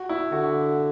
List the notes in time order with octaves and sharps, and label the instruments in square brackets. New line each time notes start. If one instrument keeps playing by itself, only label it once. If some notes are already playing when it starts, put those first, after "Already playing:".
Already playing: [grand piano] F#4
E4
[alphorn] D3 [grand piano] F#4